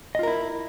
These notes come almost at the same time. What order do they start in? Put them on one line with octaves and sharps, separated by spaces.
D#5 F4 A#4 E4